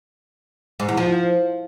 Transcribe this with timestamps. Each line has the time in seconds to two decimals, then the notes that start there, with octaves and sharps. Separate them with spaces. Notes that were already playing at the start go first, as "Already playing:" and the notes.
0.80 G#2
0.89 E2
0.97 F3